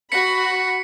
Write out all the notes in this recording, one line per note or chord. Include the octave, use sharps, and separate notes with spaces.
F#4 B5 B6 C#7